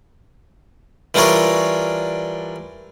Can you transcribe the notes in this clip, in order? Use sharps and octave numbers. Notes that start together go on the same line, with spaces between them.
E3 G3 D4 F4 A#4 C#5